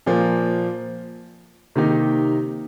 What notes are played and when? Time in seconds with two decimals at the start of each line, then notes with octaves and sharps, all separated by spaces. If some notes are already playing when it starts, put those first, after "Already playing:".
0.06 A#2 F3 A#3
1.76 C3 D#3 A#3 D#4 G4